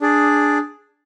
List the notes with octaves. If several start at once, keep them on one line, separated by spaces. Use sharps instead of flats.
D4 G#4 D5